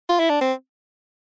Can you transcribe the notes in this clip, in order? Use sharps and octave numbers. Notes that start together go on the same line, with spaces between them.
F4
E4
D4
C4